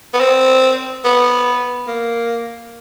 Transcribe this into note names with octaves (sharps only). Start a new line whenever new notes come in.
B3
C4
B3
A#3